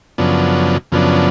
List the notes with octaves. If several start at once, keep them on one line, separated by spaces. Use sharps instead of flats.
F#2 C#3 F3 B3 D4
F#2 C#3 F3 B3 D4